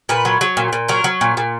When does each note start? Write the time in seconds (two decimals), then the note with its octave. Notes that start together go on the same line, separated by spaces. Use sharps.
0.09 A#2 B4
0.25 F#3
0.41 F#3
0.57 A#2
0.73 A#2
0.88 F#3 A#4
1.04 F#3
1.21 A#2
1.37 A#2